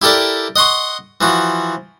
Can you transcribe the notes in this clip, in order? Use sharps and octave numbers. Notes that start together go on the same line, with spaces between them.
E4 G4 A4 A#4 D5
D#5 F#5 C6 C#6
E3 F3 F#4